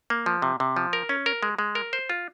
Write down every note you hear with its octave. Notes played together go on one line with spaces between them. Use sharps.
A#3
F3
C3
C3
F3
A#4
C#4
A#4
G#3
G#3
A#4
C5
F4